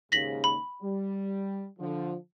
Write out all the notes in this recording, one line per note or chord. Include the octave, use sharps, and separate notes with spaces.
D#2 G#2 C#3 A#6 B6 F#7
B5
G3
D3 F3